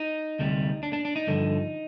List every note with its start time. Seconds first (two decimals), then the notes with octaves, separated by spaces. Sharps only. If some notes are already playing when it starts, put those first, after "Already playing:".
Already playing: D#4
0.39 D2 C3 G3
0.83 D4
0.93 D4
1.05 D4
1.16 D#4
1.27 G2 D3 F3